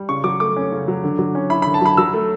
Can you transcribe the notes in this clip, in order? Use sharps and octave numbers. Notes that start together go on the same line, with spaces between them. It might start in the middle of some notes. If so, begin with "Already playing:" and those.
Already playing: G3
C#3 C#6
F#3 D6
A3 D6
C#4
C#3
F#3
D3
F#3
C#4
E4 B5
D3 B5
A5
F#3 B5
F#3 E6
A3